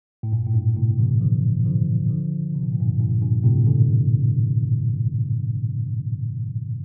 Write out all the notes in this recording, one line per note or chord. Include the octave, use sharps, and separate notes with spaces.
A2
G2 A#2
A2
G2 A#2
A2 C3
C3 E3
D3 F3
D3 F3
D3 F3
C3
A#2
A2
G2 A#2
G2 A#2
G2 A#2
A2 C3
A#2 D3